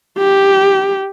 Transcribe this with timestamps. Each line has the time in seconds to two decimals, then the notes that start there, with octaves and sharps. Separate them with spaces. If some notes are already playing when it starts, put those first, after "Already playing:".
0.19 G4